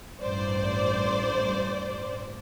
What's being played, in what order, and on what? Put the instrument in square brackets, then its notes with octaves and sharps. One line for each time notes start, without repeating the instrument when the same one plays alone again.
[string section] A1 G2 C5 D5